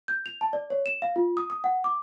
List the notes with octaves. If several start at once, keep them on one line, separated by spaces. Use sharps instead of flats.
G6
F7
A5
D5
C#5
E7
F5
F4
D#6
D#6
F#5
D6